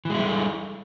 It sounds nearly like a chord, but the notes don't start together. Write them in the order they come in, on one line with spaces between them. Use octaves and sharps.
E3 G#3 E4 G3 A4